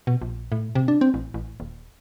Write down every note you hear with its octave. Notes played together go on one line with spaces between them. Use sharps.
B2
A#1
A2
C3
D4
C4
A1
A1
D#1